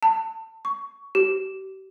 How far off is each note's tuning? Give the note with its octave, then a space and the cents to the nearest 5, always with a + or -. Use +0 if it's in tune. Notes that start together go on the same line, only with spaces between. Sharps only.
A5 +25
C#6 +15
G4 -40